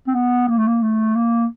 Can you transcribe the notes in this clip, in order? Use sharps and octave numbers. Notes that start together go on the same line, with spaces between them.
C4
B3
A#3
A3
A#3
A3
A#3